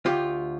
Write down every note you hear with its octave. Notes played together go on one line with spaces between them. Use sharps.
D2 F4 G4